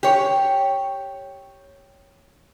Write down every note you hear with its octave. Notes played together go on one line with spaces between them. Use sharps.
G4 C#5